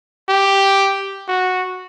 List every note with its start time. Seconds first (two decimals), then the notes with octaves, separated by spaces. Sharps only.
0.29 G4
1.28 F#4